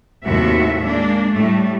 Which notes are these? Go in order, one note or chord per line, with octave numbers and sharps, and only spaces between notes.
D#2 A2 C3 F#3 F#4 E5
G#3 A#3 D4
A2 G3 A3